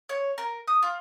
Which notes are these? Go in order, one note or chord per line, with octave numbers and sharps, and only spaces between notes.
C#5
A#4
D#6
F4